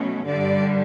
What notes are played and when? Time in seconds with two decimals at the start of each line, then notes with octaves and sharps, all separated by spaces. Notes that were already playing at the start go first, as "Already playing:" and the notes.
Already playing: B2 F#3 A3 C#4
0.26 G2 D3 G3 D5